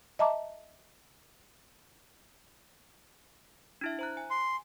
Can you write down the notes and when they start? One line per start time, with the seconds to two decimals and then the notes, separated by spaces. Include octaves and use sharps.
0.19 D#5 E5 A5 A#5 D6
3.81 D4 E4 E5
3.99 C5 A#5 F#6
4.17 G#5
4.31 C6